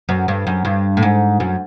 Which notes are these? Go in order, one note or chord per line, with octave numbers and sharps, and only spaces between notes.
F#2
G2
F#2
G2
A2
G#2
F#2